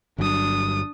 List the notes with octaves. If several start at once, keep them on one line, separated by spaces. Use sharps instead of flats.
G1 G2 F#3 D4 D#6